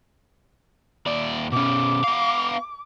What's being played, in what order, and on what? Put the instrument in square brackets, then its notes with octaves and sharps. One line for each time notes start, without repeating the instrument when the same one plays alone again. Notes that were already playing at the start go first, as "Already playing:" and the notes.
[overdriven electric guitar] D#2 D5
[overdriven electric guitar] B2 C#4 [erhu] D6
[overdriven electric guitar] B3 F5